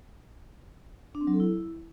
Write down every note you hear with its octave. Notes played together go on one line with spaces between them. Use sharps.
D4
C4
F#3
A4
E4